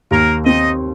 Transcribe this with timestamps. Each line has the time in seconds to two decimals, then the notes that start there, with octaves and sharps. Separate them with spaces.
0.11 D#2 A#3 A#4
0.45 C4 D#4 D#5